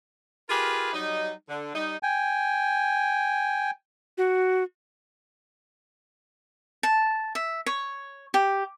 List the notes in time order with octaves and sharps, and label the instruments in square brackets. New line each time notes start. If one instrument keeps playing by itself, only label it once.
[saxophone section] F4 G4 G#4 A#4 B4
F#3 G3 D#4
D3
G3 D#4
[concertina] G5 G#5
[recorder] F#4
[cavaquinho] A5
E5
C#5
G4